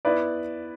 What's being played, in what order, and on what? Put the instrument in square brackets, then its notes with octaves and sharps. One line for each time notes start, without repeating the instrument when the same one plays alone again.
[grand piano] B3 E4 B4 D5